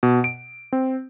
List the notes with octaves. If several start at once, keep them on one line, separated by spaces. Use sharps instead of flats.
B2
D7
C4